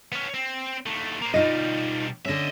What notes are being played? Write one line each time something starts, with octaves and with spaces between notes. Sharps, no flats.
B3 C#4
C4
D#2 A3
A#3 C5
B2 G3 D#4 F4 D#5
D3 C#4 D#5 E5